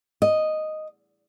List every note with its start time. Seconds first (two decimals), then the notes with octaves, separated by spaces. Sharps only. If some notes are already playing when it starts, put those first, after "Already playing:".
0.22 D#5